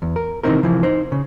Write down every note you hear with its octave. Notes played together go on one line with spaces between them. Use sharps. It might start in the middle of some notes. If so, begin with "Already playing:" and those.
E2
A#4
C3 D#3 E3 C4 D#4 A#4
C3 E3 F3
D#4 C5
C#3